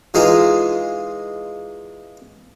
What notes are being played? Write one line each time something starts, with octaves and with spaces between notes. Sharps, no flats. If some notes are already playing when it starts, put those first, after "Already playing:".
E3 G#3 D#4 F4